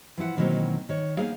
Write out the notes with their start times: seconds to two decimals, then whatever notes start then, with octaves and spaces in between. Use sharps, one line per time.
0.17 E3 F3 E4 F#5
0.37 B2 D#3 E3 F#3 A#3 C4
0.89 D#3 C#5
1.17 A#3 B3 D#4 G#4 F5